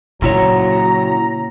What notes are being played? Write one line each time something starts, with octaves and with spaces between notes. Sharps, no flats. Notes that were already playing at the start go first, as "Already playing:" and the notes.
A#2 C#3 F#3 E4 C#5 A#5